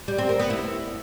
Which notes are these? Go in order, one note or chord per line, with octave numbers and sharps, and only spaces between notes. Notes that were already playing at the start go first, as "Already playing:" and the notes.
G3
C4
A#4
B3
E4